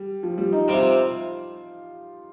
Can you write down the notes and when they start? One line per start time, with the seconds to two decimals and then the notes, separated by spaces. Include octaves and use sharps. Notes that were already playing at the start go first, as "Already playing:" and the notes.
Already playing: G3
0.23 F3
0.38 G3
0.52 D#4
0.68 C3 G3 C4 F4